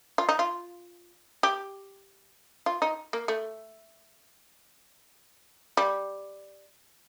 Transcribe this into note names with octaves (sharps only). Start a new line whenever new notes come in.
F4
D#4
F4
G4
F4
D#4
A#3
A3
G3